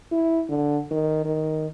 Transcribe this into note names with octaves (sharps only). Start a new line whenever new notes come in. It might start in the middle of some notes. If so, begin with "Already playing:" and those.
E4
D3
D#3
D#3